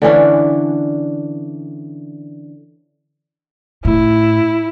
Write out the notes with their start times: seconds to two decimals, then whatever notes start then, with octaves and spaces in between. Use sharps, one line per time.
0.02 D3 E3 C#4 D4
3.85 A2 E4